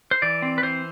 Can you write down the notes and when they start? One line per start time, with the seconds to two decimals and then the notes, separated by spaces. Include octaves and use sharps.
0.11 C5
0.22 E3 D5
0.42 C4
0.58 B4
0.63 E3 C5